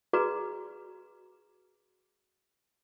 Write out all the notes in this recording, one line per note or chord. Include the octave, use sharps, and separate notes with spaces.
F#4 G#4 B4 D5 A#5 D6